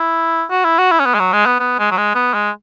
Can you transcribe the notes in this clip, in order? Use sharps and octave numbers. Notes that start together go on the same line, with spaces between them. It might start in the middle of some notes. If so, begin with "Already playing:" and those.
Already playing: E4
F#4
E4
F#4
E4
C#4
B3
G#3
F#3
G#3
B3
B3
G#3
F#3
G#3
B3
G#3